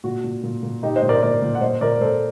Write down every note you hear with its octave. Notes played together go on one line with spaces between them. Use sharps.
A#2 F#4
A#2
A#2
A#2
A#2 D#4 G4
C5 D#5
A#2
A#4 D5
A#2 A#4 D5
A#2
F#5
A#2 C5 D#5
A#2 A#4 D5
A#2 A4 C5